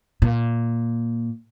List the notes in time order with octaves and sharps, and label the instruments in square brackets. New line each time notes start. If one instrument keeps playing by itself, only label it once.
[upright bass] A#2